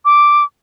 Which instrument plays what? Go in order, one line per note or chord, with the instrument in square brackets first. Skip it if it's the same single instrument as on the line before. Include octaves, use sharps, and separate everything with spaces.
[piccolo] D6